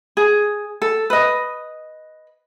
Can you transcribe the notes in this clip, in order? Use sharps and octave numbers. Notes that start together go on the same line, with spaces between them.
G#4
A4
B4 D#5